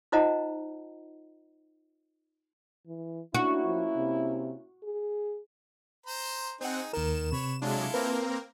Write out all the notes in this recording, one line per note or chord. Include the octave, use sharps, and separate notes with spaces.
D#4 F4 C5 D#5 F#5 A#5
E3
A#3 C#4 D4 E4 F#4
F3
C3
G#4
C5 A#5 C6
C4 D#4 G#4 F#5
D#2 D#3 A#4 E7
C3 B4 C#5 B5
F#3 G#3 D4 E4 F4 A4
A#3 C4 A#4 B4